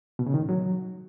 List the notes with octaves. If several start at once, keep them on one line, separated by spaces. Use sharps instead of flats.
B2
C#3
D#3
A2
F#3